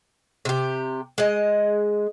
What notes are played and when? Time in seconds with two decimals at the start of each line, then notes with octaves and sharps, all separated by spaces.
0.45 C3 G4
1.18 G#3 D#5